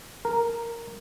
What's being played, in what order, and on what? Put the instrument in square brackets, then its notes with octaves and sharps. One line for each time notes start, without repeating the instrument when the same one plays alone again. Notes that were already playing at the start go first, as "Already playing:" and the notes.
[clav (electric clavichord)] A#4